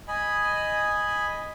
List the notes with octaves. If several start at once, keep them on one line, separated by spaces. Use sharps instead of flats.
D#5 G#5 B5